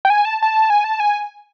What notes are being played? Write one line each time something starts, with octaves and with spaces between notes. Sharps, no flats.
G5
G#5
A5
A5
G#5
A5
G#5